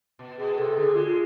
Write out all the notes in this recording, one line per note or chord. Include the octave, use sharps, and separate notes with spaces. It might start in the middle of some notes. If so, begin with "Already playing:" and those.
B2
B2 G#4
C3 A4
D3 G#4
G#3 F4